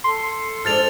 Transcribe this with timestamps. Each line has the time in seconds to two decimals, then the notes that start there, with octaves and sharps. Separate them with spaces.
0.04 A4 C6
0.65 F3 G#3 D4 F6 A6 F7